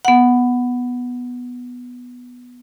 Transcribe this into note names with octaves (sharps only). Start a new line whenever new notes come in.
B3 F#5